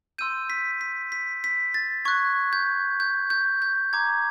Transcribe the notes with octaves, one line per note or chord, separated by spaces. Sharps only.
C6 E6 G6 D#7
B6
B6
B6
B6
A6
C#6 F#6 G#6
G6
G6
G6
G6
A#5 D6 G6 G#6